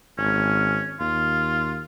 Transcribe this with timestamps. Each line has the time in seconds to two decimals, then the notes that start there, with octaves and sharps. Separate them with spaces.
0.18 G#1 C#4
1.00 D#2 F4